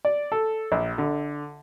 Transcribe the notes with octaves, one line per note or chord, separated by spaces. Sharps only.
D5
A4
A#1
D3